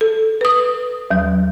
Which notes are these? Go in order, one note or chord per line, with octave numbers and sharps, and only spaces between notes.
A4
B4 D#6
D#2 F#3